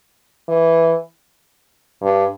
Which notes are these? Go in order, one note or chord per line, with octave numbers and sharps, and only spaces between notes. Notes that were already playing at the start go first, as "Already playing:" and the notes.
E3
G2